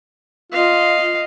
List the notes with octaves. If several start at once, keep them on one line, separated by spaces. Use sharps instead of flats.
F4 D#5 F5